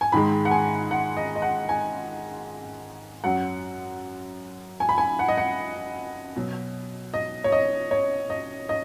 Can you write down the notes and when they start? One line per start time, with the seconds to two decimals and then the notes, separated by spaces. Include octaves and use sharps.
0.01 G#5
0.12 G#2 D#3 G#3 B5
0.45 F#5
0.51 G#5
0.91 F#5
1.17 D#5
1.36 D#5
1.42 F#5
1.69 G#5
3.24 F#2 F#3 F#5
4.80 G#5
4.89 B5
4.98 G#5
5.19 F#5
5.28 D#5
5.38 F#5
6.36 B2 F#3
7.14 D#5
7.44 C#5
7.52 D#5
7.91 C#5
8.30 D#5
8.69 D#5